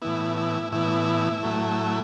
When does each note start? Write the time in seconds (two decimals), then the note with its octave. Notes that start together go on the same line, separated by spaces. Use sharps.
0.02 A2 E3 B3 E4
0.37 E4
0.72 A2 E3 B3 E4
1.43 A2 F#3 A3